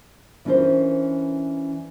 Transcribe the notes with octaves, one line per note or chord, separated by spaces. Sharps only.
E3 C#4 D4 F4 A#4 C5